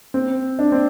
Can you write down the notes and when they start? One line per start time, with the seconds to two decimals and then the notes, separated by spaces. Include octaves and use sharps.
0.14 C4
0.59 D4
0.72 C4